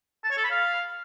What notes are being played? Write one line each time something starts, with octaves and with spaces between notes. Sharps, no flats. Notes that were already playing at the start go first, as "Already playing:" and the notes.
A5
C#5
A4
B5
F5